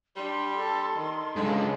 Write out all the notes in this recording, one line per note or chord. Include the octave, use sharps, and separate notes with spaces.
G3 D4 C6
A4
D#3
C#2 G#2 D3 G#3